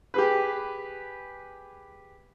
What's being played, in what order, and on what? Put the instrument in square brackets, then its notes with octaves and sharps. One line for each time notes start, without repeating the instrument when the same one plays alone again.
[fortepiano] G4 G#4 B4